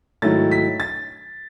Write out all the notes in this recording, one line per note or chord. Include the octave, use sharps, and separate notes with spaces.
G#2 D#3 F#3 A3 E4 A6
B6
A6